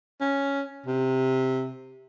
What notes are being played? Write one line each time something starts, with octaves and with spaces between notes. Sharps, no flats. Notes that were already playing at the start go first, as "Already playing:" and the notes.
C#4
C3